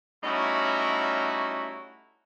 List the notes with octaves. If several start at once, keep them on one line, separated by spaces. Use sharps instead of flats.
G3 A3 C#4 D#4 E4 F#4